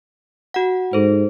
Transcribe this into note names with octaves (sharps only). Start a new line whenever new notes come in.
F#4 F#5
G#2 A4 C5